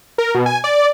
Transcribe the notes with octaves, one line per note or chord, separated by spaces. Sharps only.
A#4
B2
G#5
D5